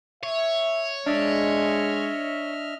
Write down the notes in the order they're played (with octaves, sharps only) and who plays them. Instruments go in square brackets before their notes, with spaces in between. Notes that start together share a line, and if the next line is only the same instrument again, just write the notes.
[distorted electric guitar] C#5 [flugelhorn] E5
[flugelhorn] G#3 [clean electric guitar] D4 [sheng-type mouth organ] D#5 E5 F6